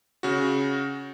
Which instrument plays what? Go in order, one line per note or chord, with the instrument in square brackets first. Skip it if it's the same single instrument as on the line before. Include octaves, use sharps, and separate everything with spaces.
[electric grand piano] C#3 F#4